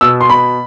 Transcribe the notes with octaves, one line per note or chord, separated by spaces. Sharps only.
B2 E6
C6
B2 B5